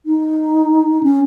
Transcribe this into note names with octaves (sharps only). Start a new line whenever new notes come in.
D#4
C#4